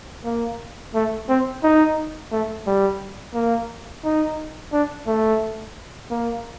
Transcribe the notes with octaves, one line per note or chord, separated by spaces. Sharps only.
A#3
A3
C4
D#4
A3
G3
A#3
D#4
D4
A3
A#3